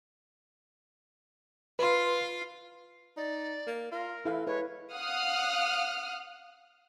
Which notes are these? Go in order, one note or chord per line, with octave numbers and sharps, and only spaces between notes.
F4 B4 F5 C6
D#4 D5
A#3
F4 A#4
E3 E4 A4 F5
G#3 E4 B4 C#5
F5 F#5 D#6 F6 F#6